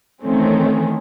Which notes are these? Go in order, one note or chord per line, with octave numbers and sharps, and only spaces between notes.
D#3 E3 A3 C4 C#4